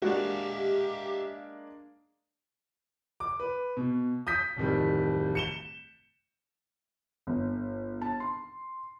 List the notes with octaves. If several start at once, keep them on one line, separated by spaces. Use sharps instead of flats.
G#3 A#3 D4 F#4 G4 E5 F5
D6
B4
B2
D#6 G6 B6
D1 F2 D#3 G3
C#7 E7 G7
G1
A5
C6